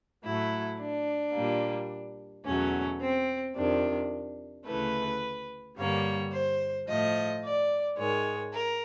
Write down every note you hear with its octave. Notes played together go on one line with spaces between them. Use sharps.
A2 F#3 A3 E4
D4
A#2 G3 A#3
E2 B2 F#3 A3 C#4
C4
F2 C3 D#3 D4
D2 C#3 E3 A3 B4
G2 D3 G3 A#3 C#5
C5
A2 F3 A3 D#5
D5
G#2 D#3 G#3 C#5
A#4